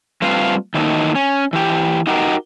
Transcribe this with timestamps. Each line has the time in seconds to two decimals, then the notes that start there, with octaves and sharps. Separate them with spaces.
0.22 G3 A3 C4 F4 B4 F5
0.74 D#3 E3 F#3 A3 A#3 D#4
1.15 C#4
1.53 E3 G4
2.07 D#4 F#4 G4 A4 A#4